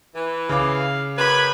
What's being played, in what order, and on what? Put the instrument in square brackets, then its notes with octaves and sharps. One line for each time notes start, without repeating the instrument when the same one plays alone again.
[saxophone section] E3
[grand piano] C#3 D6 [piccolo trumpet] F5
[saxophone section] F#2 B4 [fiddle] B5 [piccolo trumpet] G#6